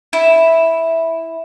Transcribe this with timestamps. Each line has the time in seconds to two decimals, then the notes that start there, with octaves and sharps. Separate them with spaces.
0.13 E4